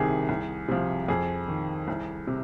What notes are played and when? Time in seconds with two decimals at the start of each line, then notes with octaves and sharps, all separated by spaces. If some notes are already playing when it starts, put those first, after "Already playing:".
Already playing: C2 C3 D#3 G#4
0.29 C2
0.68 C3 F3
1.08 F2 G#4
1.48 D#3
1.88 C2
2.27 C3